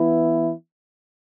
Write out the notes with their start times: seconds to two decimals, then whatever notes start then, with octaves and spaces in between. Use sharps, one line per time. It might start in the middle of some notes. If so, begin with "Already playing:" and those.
Already playing: E3 B3 E4